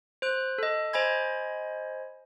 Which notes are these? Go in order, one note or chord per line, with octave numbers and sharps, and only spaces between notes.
C5 F#6
A4 D#5
C5 D#5 G#5 B5 G#6